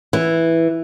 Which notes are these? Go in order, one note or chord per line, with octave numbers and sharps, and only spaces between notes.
E3